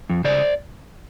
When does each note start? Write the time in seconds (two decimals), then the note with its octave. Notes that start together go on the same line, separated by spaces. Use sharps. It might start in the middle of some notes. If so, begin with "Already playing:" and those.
0.10 F2
0.24 C#3 C5 D5